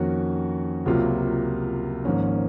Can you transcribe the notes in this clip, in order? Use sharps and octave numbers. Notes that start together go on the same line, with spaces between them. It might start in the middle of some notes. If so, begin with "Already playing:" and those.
Already playing: F2 D#3 A#3 C#4 F#4
C#2 C3 F#3 A#3 F4
G#1 G#2 F3 A#3 C#4